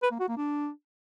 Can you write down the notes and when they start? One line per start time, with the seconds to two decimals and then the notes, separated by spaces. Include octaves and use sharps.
0.03 B4
0.11 A#3
0.20 F#4
0.28 A#3
0.37 D4